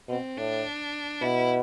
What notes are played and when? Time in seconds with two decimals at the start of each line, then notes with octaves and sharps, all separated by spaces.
0.09 B2 C4
0.37 A2 D4
1.21 B2 E4